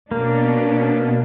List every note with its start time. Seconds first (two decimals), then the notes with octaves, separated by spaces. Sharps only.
0.11 B2 A#3 C#4 D4